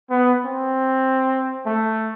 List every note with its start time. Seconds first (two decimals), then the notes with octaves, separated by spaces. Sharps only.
0.10 B3
0.45 C4
1.66 A3